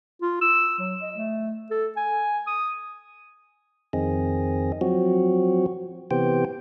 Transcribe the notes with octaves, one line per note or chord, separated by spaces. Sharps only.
F4
E6
F#3
D#5
A3
A4
G#5
D#6
F2 D#3 C4 G#4 D#5
F3 F#3 C4 F#4
C3 E3 B3 G4 C5 G5